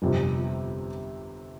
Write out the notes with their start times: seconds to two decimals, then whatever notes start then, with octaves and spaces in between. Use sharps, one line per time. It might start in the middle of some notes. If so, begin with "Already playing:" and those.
0.02 G1 F2 C3